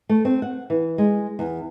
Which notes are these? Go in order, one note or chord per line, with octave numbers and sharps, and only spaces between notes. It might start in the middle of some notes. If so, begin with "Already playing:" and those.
A3
C4
F#5
E3
G#3
E2